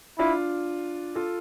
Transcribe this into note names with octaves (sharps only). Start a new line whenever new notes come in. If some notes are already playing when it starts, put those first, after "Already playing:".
D4 E4 F4
F4 A4